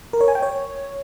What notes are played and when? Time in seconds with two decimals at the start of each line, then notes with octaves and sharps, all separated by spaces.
0.13 A#4
0.21 C#5
0.28 G#5
0.35 G5
0.43 C#5